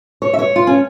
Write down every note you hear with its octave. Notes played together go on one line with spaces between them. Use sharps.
C#5
E5
C#5
F4
C#4